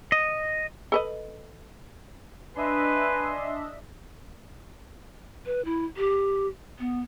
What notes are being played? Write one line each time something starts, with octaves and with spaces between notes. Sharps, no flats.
D#5
A4 B4 D#5
D4 B4 D#5 E5 G#5 C6
B4
E4
G4
B3